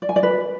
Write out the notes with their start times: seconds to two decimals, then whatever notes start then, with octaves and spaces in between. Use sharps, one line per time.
0.02 D5
0.09 G#5
0.16 D5
0.23 B4